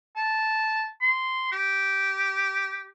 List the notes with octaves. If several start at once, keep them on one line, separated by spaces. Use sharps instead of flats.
A5
C6
G4